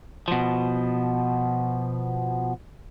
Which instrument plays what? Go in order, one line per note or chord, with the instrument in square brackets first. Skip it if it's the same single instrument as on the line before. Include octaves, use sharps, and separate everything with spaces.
[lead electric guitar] B2 F3